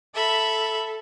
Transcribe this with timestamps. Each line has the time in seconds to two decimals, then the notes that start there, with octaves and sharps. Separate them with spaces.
0.15 A4 E5 B5